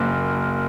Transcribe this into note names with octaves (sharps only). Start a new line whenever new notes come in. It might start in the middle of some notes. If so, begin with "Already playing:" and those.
Already playing: F#1 A#3